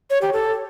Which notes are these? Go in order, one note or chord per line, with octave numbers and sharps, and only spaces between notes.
C#5
G4
A4